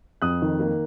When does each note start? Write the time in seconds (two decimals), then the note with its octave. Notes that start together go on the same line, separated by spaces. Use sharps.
0.22 F2 D#6 F#6
0.42 D#3
0.60 A#3